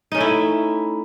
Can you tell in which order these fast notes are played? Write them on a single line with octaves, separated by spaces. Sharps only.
D#4 C#4 A3 E4